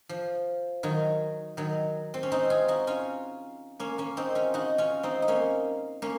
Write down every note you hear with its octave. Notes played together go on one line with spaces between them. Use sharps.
F3
D#3 F#3
D#3 F#3
C4
C#4
C4 D#4
F4 G#4
D#4 F#4
C#4 F4
A#3 C#4
A#3 C#4
C4 D#4
C#4 F4
D#4 F#4
C#4 F4
C4 D#4
D#4
A#3 C#4
A#3 C#4